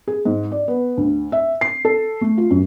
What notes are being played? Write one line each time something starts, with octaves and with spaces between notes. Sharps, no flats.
G#4
G#2
D5
B3
D2
E5
C7
A4
A3
F4
F#2